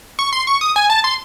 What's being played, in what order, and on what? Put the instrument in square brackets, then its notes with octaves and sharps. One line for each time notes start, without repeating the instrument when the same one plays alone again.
[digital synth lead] C#6
C6
C#6
D#6
G#5
A5
C6